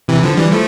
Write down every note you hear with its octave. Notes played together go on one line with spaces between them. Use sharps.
C3 E3
D3 F3
E3 G3
F3 A3